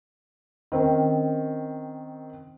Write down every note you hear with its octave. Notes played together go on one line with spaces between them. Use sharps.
D#3 C4 C#4